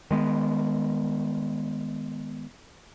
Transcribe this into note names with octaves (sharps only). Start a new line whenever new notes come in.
D#3 G#3 B3